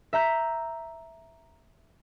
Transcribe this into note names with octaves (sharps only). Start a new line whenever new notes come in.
E5 A#5 G6 B6